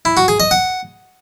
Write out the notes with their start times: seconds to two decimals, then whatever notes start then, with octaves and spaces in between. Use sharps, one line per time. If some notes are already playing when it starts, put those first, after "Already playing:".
0.05 E4
0.17 F#4
0.28 G#4
0.40 D#5
0.51 F#5